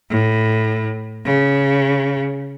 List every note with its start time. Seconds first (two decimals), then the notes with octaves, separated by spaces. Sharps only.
0.11 A2
1.25 C#3